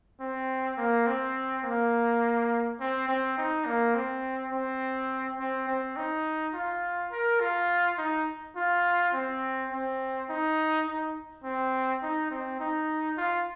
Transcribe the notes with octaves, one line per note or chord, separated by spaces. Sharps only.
C4
A#3
C4
A#3
C4
C4
D#4
A#3
C4
C4
C4
C4
D#4
F4
A#4
F4
D#4
F4
C4
C4
D#4
D#4
C4
D#4
C4
D#4
F4